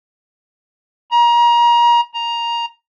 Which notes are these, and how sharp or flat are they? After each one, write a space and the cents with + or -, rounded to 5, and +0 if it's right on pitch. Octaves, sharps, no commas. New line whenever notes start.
A#5 +30
A#5 +10